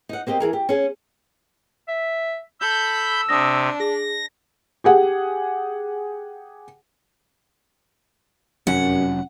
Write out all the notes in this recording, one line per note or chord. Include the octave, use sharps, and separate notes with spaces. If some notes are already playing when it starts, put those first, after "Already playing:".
D#4 F#5
A#3 C4 G4 D#5
E3 G#4 A#4
G4
C#4 G#4
E5
A4 B5 E6 G6
C3 D4 D#6 A#6
G#4 A#6
G4 G#4 F#5
F1 F#2 F#3 C#4 F#5